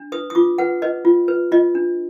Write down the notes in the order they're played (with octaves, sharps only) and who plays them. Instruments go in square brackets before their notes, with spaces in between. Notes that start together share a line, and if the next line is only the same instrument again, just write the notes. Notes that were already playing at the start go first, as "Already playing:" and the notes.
Already playing: [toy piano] D4
B4 D#6
D#6
F4 D6
B4 F#5
B4 D#5
F4
B4
F4 D#5
D4